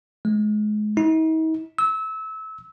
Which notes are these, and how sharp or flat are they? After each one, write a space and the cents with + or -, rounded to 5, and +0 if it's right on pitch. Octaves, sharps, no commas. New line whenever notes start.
G#3 +30
D#4 +45
E6 -25